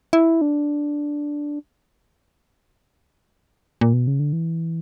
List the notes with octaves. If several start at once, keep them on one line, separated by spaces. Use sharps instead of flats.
E4
D4
A#2
B2
C#3
D3
E3